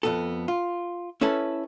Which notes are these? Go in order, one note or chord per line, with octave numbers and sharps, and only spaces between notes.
F2 B3 A4
F4
C#4 E4 A4 B4